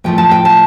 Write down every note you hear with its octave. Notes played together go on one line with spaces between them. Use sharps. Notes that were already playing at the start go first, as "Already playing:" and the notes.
A2 F3 A3 G5
A5
G5
A5